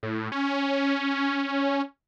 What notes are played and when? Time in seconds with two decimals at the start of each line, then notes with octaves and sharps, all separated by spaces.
0.03 A2
0.32 C#4